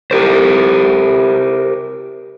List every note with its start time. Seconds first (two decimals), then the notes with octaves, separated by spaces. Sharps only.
0.11 G4 A#4 C5